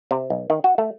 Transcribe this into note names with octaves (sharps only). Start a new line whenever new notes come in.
C3
B1
D#3
F#4
A3